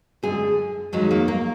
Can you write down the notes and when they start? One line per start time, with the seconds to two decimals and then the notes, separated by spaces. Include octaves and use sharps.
0.23 F#2 D3 G#3 G#4
0.93 F2 D#3 F#3 G#3
1.11 A#3
1.28 A#3